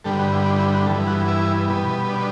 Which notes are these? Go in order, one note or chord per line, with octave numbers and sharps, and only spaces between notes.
G2 D3 G3 B3 A4
F#4
E4
D4
E4
F#4
G2 E3 B3 A4
F#4
E4
B2 G3 B3
D4